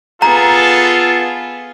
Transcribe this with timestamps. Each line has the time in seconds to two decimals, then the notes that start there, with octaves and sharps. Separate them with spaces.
0.22 B3 F4 G#4 A4 A#5